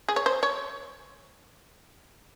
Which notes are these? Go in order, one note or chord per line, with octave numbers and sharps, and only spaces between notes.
G#4
C#5
C5
C#5